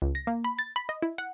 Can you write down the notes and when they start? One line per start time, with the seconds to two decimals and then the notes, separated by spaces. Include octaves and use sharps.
0.02 C#2
0.15 A#6
0.27 A#3
0.44 B5
0.59 A6
0.76 B5
0.89 D#5
1.02 E4
1.18 F#5